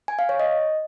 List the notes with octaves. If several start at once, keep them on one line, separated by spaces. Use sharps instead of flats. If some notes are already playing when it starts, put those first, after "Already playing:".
G#5
F5
C#5
D#5